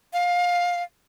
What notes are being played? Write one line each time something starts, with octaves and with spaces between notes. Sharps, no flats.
F5